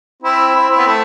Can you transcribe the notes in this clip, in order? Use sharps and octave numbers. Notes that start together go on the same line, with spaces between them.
C4 E4
C4 E4
C4 E4
B3
A3